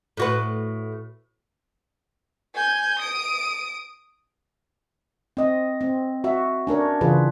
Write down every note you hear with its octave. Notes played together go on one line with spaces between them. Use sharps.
A2 F#4 B4
G#5 G6
D#6 D7
C4 D#5
C4
F#4 E5
C#4 D4 A#4 C#5
C#3 E3 F4 G#4 B4